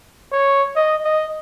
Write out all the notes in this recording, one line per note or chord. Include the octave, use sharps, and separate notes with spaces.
C#5
D#5
D#5